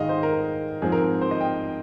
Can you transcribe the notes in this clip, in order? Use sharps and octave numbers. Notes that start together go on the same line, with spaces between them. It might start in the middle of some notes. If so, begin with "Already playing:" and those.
Already playing: G#2 D#3 G#3 D#5 F5
C5
A#4
G#2 F3 C4 G#4
A#4
C5
D#5
G5